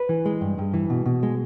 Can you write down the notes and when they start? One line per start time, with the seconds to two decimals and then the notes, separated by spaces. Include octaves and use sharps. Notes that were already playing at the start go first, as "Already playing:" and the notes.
Already playing: B4
0.09 E3
0.26 G#3
0.41 G2
0.58 G2
0.74 E3
0.90 B2
1.06 B2
1.23 G#3